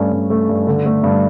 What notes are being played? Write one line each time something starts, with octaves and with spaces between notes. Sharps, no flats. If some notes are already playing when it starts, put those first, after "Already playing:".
Already playing: G2 A3 C#4
G2
A3
G2
D3
A3
G2